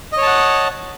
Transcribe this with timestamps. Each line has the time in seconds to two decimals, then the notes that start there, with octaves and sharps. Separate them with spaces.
0.12 D#5
0.17 C#5
0.22 A5
0.27 F#5